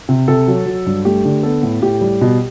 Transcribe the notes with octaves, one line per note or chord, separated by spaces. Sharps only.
C3
C3 A4
F#3
F#3
G2
A3 G4
D3
B3 A4
A2
A2 G4
G3
B2